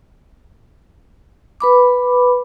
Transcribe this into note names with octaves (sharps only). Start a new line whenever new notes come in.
B4 B5 D6